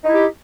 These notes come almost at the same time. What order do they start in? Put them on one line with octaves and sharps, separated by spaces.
D#4 E4 G4